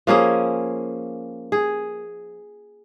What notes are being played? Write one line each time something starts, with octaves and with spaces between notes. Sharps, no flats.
F3 A#3 C#4 G#4
G#4